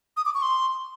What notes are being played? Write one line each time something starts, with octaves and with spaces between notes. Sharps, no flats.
D#6
D6
C#6
C6